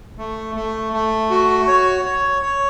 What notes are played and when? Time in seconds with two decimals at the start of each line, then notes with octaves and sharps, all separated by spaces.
0.18 A3
0.55 A3
0.93 A3
1.30 F#4
1.68 C#5
2.05 C#5
2.42 C#5